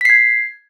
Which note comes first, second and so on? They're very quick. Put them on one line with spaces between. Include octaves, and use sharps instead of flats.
B6 C7 G#6